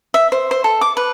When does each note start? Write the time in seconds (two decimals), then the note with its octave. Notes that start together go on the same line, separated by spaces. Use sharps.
0.14 E5
0.32 C5
0.51 C5
0.64 A4
0.81 D6
0.97 B4